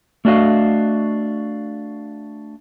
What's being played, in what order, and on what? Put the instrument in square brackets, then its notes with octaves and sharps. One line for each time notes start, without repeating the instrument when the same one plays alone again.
[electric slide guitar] A3 D4 F#4 D#5 F5